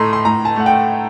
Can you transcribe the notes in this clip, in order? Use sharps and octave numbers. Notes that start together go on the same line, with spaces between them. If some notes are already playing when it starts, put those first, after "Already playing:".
Already playing: A2 A3 A#5 C6
C6
A2 A#5
A5
A3 F#5
G5